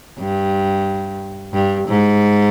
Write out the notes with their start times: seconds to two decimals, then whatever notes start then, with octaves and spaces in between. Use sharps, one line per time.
0.19 G2
1.53 G2
1.88 G#2